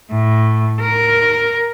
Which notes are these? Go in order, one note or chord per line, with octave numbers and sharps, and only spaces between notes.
A2
A#4